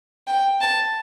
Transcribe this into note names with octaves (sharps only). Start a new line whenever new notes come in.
G5
A5